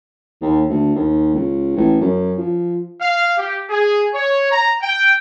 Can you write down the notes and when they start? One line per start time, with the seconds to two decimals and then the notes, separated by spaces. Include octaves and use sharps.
0.41 D#2
0.70 D2
0.95 D#2
1.35 C#2
1.76 A1
2.01 F#2
2.38 F3
3.01 F5
3.37 G4
3.70 G#4
4.14 C#5
4.51 A#5
4.83 G5